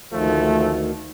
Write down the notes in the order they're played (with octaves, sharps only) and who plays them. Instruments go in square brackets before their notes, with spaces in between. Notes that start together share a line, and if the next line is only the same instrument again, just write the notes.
[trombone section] G#1 F3 A3 [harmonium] D2 D#3